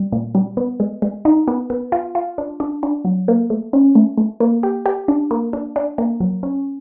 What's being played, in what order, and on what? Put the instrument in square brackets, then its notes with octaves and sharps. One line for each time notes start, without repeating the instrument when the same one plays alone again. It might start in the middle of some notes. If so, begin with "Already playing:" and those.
Already playing: [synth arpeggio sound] G3
A#2
G3
B3
G#3
G#3
D#4
B3
B3
F4
F4
D4
D4
D4
F#3
A#3
A3
C#4
A3
A3
A#3
G4
G4
D4
A#3
D4
D4
A#3
F#3
C#4